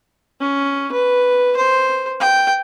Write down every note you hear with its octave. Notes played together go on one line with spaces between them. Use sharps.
C#4
B4
C5
G5